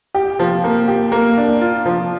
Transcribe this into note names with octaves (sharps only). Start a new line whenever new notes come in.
G4
F3
A#3
G4
A#3
D4
F4
F3